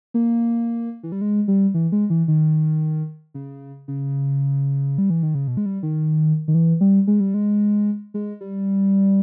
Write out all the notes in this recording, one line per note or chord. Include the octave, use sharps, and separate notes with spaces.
A#3
E3
G3
G#3
G3
E3
G#3
E3
D#3
C#3
C#3
G3
E3
D#3
C#3
B2
G#3
G3
D#3
D#3
E3
G3
G#3
G3
G#3
G#3
G3